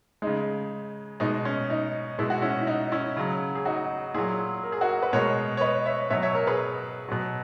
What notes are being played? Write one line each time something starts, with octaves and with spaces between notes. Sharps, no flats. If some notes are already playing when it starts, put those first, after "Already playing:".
C#3 G#3 D#4
B2 G#3 D#4
C#4
D#4
B2 G#3 E4
F#4
C#4 E4
E4
D#4
C#4 E4
C#3 F#3
G#4
D#4 F#4
A#2 F#3 E4 G#4
A#4
G#4
F#4 A#4
B4
B2 G#3 A#4 C#5
C#5
B4 D#5
C#5 E5
B2 F#3 C#5 E5
C#5 E5
A#4 C#5
G#4 B4
B2 F#3